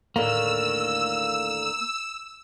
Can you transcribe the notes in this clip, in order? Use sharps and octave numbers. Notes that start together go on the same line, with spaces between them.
D#2 A2 D3 A#3 E6